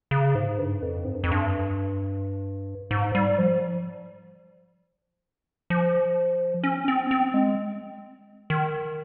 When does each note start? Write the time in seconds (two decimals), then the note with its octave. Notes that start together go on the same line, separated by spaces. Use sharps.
0.11 C#3
0.35 G#2
0.58 G2
0.82 F2
1.04 G#2
1.14 G2
1.24 F2
1.32 G2
2.91 G#2
3.15 G3
3.38 F3
5.70 F3
6.63 C#4
6.88 C4
7.11 C4
7.34 G#3
8.50 D#3